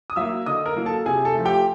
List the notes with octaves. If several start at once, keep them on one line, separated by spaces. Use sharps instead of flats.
D#6
F#3 A#3 E5 E6
D3 D#5 D#6
A#4 A#5
F#3 A#3
A4 A5
C3 G#4 G#5
A4 A5
F3 A3
G4 G5